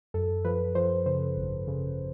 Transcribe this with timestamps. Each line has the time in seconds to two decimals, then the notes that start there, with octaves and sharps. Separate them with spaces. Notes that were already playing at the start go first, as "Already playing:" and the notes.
0.14 F#2 A4
0.45 F3 B4
0.75 F3 C5
1.06 C#3 C5
1.37 G#1
1.67 C#3